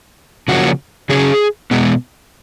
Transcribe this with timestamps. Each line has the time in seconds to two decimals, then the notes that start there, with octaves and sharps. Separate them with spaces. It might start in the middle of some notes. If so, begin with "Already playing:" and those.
0.48 C#3 F3 A#3 C#4 F#4
1.09 C#3 F#3 C#4 G#4
1.71 B2 G#3 B3